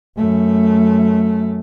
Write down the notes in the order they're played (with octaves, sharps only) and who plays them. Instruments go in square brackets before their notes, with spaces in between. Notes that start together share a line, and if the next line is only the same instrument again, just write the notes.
[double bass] F#2 A3